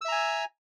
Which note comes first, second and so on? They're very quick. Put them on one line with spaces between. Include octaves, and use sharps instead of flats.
E6 E5 A#5 G#5